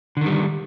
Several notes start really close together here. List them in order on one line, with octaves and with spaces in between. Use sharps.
D3 D#3 G3